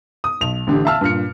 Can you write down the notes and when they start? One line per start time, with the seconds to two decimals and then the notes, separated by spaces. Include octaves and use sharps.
0.24 D#6
0.41 B1 F7
0.67 A1 D3 G4
0.85 E5 F5 A5 E6 F6
1.01 G2 A#2 F6 C#7